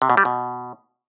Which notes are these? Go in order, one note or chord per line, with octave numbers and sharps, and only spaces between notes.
C3
B2
G3
B2